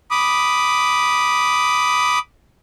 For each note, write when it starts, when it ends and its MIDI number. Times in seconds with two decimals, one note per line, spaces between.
0.11 2.19 83
0.11 2.19 86
0.11 2.19 87